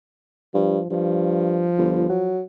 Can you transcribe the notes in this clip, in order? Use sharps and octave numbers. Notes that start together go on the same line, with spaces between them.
G2 F3
G2 F3
G1
F#3